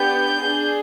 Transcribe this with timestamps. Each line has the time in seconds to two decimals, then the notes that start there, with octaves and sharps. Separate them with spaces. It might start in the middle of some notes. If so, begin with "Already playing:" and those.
Already playing: B3 D4 G4 G6
0.43 D4 G#4